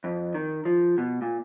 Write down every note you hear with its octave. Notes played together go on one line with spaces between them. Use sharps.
F2
D#3
F3
B2
A#2